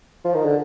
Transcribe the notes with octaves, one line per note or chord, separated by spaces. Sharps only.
F3
D#3
D3